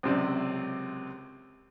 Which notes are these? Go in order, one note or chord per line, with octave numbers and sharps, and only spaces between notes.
C#2 F#2 C3 C5 D5